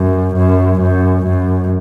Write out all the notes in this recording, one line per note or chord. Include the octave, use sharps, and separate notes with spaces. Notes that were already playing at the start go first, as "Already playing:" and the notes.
Already playing: F#2
F#2
F#2
F#2